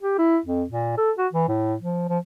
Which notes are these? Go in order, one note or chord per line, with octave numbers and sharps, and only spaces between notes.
G4
E4
F2
A#2
A4
F#4
E3
A2
F3
F3